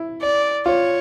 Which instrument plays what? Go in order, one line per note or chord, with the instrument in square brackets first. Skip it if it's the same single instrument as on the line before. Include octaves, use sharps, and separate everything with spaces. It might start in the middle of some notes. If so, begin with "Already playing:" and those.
Already playing: [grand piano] E4
[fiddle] D5
[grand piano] F4 [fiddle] C#5